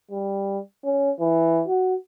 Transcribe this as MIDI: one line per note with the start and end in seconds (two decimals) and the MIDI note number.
0.11 0.59 55
0.84 1.11 61
1.20 1.63 52
1.68 1.95 66